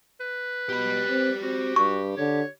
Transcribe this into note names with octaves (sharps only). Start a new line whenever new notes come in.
B4
B2 G4 B5
C4
C4 F#4
G2 C#6
D3 C#5